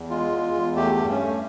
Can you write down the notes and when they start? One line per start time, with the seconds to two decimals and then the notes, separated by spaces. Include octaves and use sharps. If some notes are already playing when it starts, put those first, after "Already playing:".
Already playing: E2
0.10 G#3 F4
0.32 E2
0.54 E2
0.76 A3 G4
0.98 G2
1.10 C#4
1.21 A3